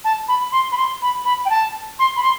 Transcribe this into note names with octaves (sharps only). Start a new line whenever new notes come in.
A5
B5
C6
B5
C6
B5
B5
G5
A5
C6
B5
C6